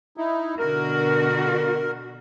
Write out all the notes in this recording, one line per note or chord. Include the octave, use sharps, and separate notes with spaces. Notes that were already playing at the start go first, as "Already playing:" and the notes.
D#4 E4
B2 D3 F#4 A#4